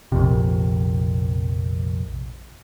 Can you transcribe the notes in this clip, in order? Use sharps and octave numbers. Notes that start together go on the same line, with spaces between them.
A#1 F2 C3